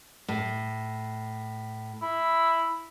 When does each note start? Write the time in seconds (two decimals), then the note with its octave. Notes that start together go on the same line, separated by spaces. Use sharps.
0.28 A2
2.02 E4